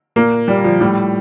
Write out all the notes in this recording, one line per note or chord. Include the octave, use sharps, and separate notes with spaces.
A#2 A#3
A#2 G3
F3
A2 G3